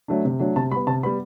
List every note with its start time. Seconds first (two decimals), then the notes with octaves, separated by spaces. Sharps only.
0.08 F#3 A3 D4
0.25 C3
0.40 F#3 A3 D4
0.56 C3 A5
0.71 G3 B3 B5
0.87 C3 A5
1.03 G3 B3 B5